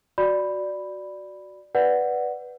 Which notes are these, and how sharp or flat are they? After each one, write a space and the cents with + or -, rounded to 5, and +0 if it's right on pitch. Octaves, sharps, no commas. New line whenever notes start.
F#4 +0 D5 +0 B5 +0
B4 +0 D5 +0 F#5 +0